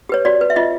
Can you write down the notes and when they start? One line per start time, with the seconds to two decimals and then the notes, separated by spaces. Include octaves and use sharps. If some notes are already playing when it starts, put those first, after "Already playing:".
0.09 G4 B4 C#5
0.25 F#4 D5
0.41 B4
0.50 E5
0.56 F4 D#5